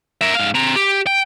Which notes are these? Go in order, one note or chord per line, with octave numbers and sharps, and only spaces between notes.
A#4 E5
G#2 F5
C4 A#5
G4
G5